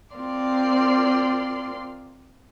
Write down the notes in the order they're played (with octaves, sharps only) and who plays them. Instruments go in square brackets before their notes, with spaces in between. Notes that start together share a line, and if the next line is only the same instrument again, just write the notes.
[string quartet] C4 F4 A#4 D5 C6